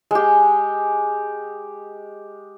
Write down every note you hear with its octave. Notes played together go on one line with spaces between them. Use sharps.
G#3 G4